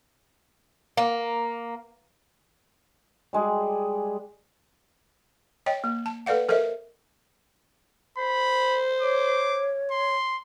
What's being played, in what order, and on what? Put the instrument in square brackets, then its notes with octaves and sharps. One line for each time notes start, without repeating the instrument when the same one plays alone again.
[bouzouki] A#3
[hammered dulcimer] G3 G#3 G#4
[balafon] C#5 D#5 G5
A#3
A5
A4 B4 D5 F5 F#5
A4 A#4 C5 D#5 E5
[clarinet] C5 [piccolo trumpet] B5
[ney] C#5 [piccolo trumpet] D6
[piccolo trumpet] C6